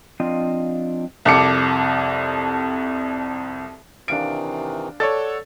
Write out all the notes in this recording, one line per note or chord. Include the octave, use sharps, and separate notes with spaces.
F3 C4 D4 F4 D#5
C2 F2 A5 D6 C#7
C3 D#3 E3 D4 F5 D7
A4 C#5 D5 F#5 A6